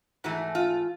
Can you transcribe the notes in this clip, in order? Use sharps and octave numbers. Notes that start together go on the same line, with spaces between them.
G#2 E3 A3 F#4
F4